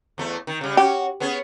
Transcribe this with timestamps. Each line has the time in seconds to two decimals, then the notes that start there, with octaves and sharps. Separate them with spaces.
0.18 E2 A3
0.47 D#3
0.61 C#3 G3
0.77 C#4 F#4 G4
1.20 B3 C#4 G#4